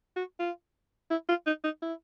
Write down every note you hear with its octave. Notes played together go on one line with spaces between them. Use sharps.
F#4
F4
E4
F4
D#4
D#4
E4